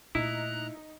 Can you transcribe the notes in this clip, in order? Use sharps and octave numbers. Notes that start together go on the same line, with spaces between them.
A#2 A3 D#4 E4 A#5 F#6